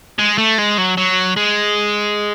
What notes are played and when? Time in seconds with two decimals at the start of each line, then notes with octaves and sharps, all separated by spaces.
0.19 G#3
0.38 A3
0.58 G#3
0.78 F#3
0.97 F#3
1.36 G#3